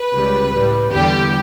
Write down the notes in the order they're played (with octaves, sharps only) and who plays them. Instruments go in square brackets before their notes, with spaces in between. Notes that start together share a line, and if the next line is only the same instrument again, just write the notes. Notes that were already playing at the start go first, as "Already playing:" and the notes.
Already playing: [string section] B4
C#2 C#3 G3
A2 G3
E2 D3 G3 G4